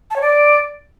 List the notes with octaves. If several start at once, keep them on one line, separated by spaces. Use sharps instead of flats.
A5
C#5
D5